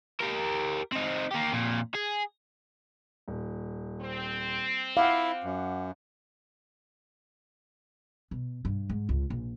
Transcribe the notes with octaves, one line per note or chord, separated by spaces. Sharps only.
G4 A#4
C4 D#4
A#3 G4
F2 A#2
G#4
D#1
C4
E4 F5 F#5 D6
F#2
B2
G2
G#2
C#2
A#1